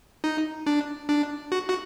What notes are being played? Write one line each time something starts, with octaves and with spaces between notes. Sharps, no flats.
D#4
D4
D4
F#4
F#4